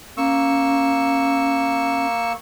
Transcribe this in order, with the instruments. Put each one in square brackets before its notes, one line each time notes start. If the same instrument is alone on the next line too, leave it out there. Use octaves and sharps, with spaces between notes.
[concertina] A#3 C#6 E6 [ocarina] C#4